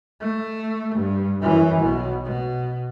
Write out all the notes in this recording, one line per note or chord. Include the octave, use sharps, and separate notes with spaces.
A3
G2
F#2 E3
B1 B2
B2